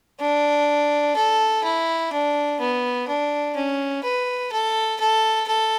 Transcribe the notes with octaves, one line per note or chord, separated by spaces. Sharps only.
D4
A4
E4
D4
B3
D4
C#4
B4
A4
A4
A4